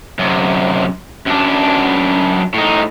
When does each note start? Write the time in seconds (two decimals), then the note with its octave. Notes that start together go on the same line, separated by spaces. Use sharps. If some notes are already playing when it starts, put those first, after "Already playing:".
0.19 F#2 C3
1.26 F#2 D4
2.54 A2 D#4